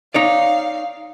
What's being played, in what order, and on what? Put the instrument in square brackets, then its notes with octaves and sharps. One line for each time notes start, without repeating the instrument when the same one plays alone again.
[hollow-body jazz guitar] D#4 C#5 D5 [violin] F5